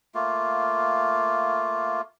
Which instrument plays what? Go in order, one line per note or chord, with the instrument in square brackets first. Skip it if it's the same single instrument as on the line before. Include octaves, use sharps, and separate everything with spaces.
[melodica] A3 A#3 F4